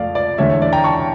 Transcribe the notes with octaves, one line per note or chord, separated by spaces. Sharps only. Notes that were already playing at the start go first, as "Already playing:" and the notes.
Already playing: F2 A3 D5 F5
D5
E2 D3 A3 C#5 E5
C#5
D5
G5 A#5
A5 C#6